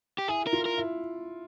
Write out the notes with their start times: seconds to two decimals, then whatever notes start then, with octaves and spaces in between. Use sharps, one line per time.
0.18 G4
0.28 E4 G#4
0.47 A#4
0.53 F4
0.65 A#4
0.78 E4